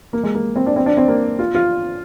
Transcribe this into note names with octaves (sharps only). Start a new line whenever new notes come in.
A#3
G#3
A#3
C4
D4
C4
D4
C4
A#3
F4
F4